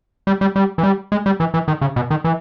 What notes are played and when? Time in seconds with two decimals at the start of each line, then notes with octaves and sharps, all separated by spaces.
0.27 G3
0.41 G3
0.56 G3
0.78 E3
0.83 G3
1.12 G#3
1.26 G3
1.40 E3
1.54 E3
1.68 D#3
1.81 C#3
1.96 B2
2.10 D#3
2.24 E3